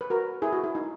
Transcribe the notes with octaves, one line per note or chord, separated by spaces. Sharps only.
B4
F#4 A#4
E4 G#4
F#4
E4
D#4